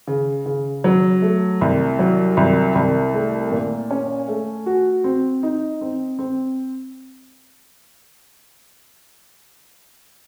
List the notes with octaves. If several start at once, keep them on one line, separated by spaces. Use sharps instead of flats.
C#3
C#3
F#3
A3
C2
F#3
C2
C2
A3
A#2
C#4
A3
F#4
C4
D#4
C4
C4